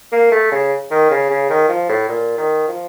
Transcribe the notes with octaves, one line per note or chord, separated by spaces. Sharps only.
A#3
A3
C#3
D#3
C#3
C#3
D#3
F3
A2
A#2
D#3
F3